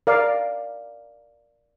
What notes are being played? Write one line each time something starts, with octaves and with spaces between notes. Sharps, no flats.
A#4 D5 F5